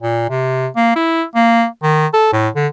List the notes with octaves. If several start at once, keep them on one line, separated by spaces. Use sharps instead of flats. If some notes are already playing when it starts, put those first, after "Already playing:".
A#2
C3
A#3
E4
A#3
D#3
A4
A2
D3